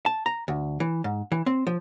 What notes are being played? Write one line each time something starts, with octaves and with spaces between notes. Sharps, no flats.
A5
A#5
D2
E3
G#2
E3
C4
F3